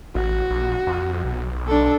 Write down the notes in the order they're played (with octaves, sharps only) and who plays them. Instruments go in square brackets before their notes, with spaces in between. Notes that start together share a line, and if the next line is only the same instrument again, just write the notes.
[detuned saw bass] A1 [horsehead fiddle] F#4
[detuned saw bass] A#1
F2
B1
[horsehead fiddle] D4 A4